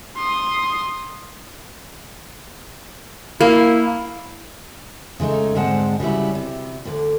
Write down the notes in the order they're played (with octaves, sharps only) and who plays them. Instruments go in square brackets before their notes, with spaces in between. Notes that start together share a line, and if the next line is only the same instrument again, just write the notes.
[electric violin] C6 D#6
[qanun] A#3 [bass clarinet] E4
[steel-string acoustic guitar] C#3 G#3 A3 D#4
G#2 D3 G#3 C4 F#5 A5
C#3 F#3 G3 E4
C3
D2 D3